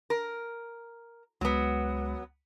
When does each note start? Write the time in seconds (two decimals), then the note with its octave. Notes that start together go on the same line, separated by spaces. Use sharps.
0.10 A#4
1.41 C#2 F#3 G#3 B3